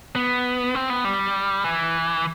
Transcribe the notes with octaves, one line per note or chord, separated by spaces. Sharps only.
B3
C4
B3
G3
E3